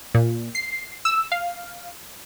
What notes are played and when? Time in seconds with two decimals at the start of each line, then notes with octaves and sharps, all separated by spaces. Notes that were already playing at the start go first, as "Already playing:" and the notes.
0.15 A#2
0.55 C7
1.05 E6
1.32 F5